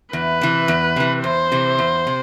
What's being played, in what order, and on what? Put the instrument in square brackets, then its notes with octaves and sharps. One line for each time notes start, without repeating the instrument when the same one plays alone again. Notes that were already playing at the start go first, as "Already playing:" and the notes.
[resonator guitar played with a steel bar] E2 [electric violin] B4
[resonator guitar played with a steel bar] C3 E3
E2
C3 E3
[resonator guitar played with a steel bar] E2 [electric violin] C5
[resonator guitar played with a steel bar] C3 E3
E2
C3